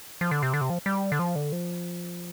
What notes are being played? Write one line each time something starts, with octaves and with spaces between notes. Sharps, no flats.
F3
D3
C3
D3
C3
F3
G3
D3
F3
D3
F3